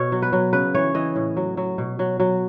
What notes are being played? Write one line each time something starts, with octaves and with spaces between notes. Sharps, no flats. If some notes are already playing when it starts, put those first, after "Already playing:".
Already playing: B2 C#5
F#3
B4
F#3
C#3 B4
E3 C#5
E3 D#5
A2
F#3
F#3
B2
F#3
F#3